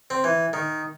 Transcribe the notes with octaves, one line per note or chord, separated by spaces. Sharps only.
C4
E3
D#3